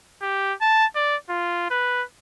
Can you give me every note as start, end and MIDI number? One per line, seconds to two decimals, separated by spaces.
0.22 0.53 67
0.62 0.85 81
0.96 1.16 74
1.30 1.66 65
1.70 2.03 71